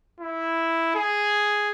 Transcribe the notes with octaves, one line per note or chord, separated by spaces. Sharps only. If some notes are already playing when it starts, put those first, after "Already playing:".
E4
G#4